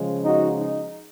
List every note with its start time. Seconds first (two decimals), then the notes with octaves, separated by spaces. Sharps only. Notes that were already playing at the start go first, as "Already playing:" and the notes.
Already playing: C#3 F3 G#3
0.25 D#4 F#4
0.58 D#4